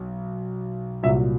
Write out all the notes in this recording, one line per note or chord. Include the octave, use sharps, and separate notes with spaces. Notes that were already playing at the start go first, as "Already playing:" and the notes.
Already playing: B1
C2 A#2 F#3 E5